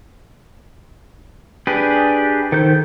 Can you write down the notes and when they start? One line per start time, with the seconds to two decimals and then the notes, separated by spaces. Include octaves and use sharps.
1.67 D4 G4 G#4 B4
2.52 D#3 A4 C5 G6